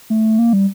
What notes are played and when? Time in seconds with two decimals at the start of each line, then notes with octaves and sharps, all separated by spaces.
0.10 A3
0.39 A#3
0.53 G3